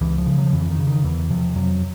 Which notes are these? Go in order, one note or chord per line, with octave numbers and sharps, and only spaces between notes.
C#2 E3
F3
C#3
F#3
F3
F2 E3
D#3
C#3
D#3
E2 E3
C3 F3
F2 F#3